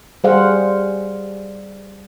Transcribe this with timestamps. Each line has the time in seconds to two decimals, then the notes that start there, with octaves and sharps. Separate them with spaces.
0.24 G3 G#4 C5 F5 F#5